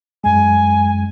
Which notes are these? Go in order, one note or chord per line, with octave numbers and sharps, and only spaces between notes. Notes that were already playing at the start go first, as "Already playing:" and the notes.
F#2 G#3 G#5